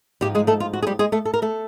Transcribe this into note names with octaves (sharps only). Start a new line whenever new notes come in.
G#2 F3 G3 G#3 G4
G#3 G#4
A3 A4
F4
F#4
G#4
G3 G4
G#3 G#4
A3 A4
A4
A#4
A3 A4